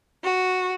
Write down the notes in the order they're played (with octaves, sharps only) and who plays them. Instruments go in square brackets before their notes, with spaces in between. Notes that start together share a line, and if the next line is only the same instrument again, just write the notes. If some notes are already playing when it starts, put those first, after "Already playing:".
[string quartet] F#4